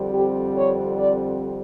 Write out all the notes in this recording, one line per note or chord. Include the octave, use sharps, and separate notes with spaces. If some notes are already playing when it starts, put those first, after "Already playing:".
Already playing: F2 D3 G3 C4
G4
C#5
D5